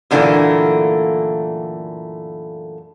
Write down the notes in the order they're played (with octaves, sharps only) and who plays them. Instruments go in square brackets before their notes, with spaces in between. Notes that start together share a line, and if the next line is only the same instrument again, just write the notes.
[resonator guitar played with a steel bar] F#2 A#2 D3 E3 A3 A#3